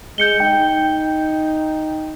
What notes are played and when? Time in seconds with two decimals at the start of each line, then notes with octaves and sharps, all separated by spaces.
0.18 G#3 G6 C#7 G7
0.40 D#4 G5